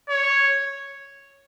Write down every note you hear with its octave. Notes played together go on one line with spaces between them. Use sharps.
C#5